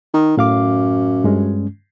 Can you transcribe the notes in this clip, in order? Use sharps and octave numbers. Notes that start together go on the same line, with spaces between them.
D#3
F#2 A2 F5 D6
G2 G#3 C#4